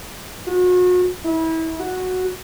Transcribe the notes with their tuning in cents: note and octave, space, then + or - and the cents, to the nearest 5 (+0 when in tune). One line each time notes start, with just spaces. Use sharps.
F#4 -35
E4 -30
F#4 -5